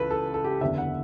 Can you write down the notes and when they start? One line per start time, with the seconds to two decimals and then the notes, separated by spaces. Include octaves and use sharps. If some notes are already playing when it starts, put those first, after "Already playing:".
Already playing: C#2 C#3 E3 A4 B4
0.11 A4
0.34 A4
0.44 G4
0.61 F#1 E2 D3 E5
0.78 F#5